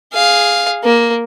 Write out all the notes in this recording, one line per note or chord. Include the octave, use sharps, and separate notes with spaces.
G#4 F5
A#3